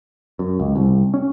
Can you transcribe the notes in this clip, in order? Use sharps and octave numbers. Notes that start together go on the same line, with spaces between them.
F#2
C#2
C2
C#4